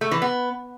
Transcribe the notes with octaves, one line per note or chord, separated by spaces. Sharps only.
A3
E3
B3